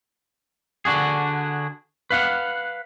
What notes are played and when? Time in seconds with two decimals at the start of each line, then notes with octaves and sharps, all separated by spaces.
0.85 D3 D4 F#4 G#4
2.10 B4 F5 F#5